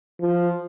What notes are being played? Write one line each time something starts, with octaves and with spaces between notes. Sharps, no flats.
F3